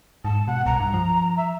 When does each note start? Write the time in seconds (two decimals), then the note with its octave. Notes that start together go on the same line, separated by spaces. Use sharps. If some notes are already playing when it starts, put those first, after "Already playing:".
0.25 G#2 A5
0.48 B2 F#5
0.66 C2 A#5
0.80 G2
0.94 F3
1.37 E5